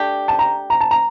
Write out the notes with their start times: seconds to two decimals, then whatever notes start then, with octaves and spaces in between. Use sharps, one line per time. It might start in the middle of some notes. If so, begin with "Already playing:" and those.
Already playing: A3 D4 G4
0.28 A5
0.39 A#5
0.70 A#5
0.81 A5
0.91 A#5